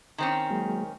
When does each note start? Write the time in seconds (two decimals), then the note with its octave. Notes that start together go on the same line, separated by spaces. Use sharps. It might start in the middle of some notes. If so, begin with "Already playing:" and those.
0.18 D#3 C4 C#4
0.50 F#3 G#3 A#3